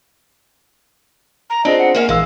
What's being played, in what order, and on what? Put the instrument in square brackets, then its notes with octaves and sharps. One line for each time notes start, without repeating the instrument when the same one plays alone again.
[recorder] A#5
[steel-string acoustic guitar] C4 [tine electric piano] D4 F4 G#4 [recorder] D#5
[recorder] F#5
[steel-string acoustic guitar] A#3 C#4 F5 [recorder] A#4
[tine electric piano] A#1 E3 E6 [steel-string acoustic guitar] G#3 [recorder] F5